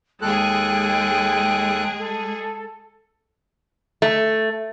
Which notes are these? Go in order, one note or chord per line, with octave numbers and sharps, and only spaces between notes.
D#2 G#3 G#4 A4 G5 F#6
A4
A3